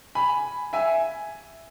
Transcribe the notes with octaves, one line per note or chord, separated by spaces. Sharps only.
G#5 B5
E5 G#5